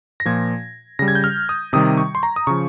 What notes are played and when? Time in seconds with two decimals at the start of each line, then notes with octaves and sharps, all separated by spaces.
0.20 A#6
0.25 A#2 F3 G#6
0.99 C#3 G3 A#6
1.08 G#6
1.15 G6
1.24 F6
1.49 D#6
1.73 C3 D#3 G3 D#6
1.97 C#6
2.15 C6
2.23 A#5
2.36 D#6
2.47 C#3 F3 C#6